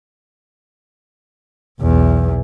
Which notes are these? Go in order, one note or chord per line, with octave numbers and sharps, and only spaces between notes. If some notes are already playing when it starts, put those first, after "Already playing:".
B1 E2